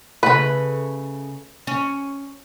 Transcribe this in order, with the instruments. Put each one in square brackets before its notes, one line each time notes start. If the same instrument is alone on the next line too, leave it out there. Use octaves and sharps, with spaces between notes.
[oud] C#3 A3 [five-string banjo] B4
[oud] C#4